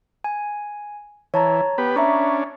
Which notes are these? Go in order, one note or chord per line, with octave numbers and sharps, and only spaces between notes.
G#5
E3 C#5 A5 A#5
B3 G4 B4
C#4 D4 E5 A#5 B5